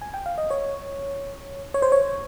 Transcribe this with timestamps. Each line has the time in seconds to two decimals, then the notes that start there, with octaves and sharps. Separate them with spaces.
0.01 G#5
0.14 G5
0.26 F5
0.38 D#5
0.50 C#5
1.74 C#5
1.82 C5
1.92 C#5